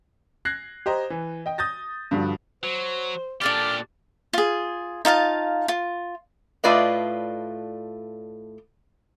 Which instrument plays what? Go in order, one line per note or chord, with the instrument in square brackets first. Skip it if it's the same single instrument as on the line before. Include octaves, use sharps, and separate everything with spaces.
[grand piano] F#6 G#6 A#6 C7
G4 C5 D#5 A#5
E3
D#5 G5
D#6 G6 A6 A#6
G2 D3 F3 G3 F#4
[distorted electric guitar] F#3 [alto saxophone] C5
[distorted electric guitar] A#2 G4 [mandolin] D4 A4 D5 [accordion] D6 F6
[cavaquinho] F4 G#4
D#4 F4 F5 A5
F4
[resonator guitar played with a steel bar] A2 A3 F4 B4 D5 D#5